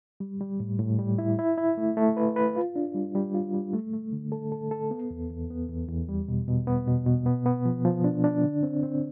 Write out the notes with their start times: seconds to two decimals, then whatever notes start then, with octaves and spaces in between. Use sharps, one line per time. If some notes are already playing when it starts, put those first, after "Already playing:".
0.20 G3
0.41 G3
0.60 A2
0.79 A2
0.99 G3
1.18 E4
1.39 E4
1.58 E4
1.77 A3
1.97 A3
2.17 B4
2.36 B4
2.56 F4
2.76 D4
2.95 G3
3.15 G3
3.34 F4
3.54 G3
3.73 A3
3.93 A3
4.13 D3
4.32 A4
4.52 A4
4.71 A4
4.91 B3
5.10 E2
5.30 E2
5.50 B3
5.69 E2
5.89 E2
6.09 G3
6.28 B2
6.48 B2
6.67 B3
6.87 B2
7.07 B2
7.26 B3
7.46 B3
7.65 F3
7.85 F3
8.04 D4
8.24 D4
8.44 D3
8.63 C4
8.83 C4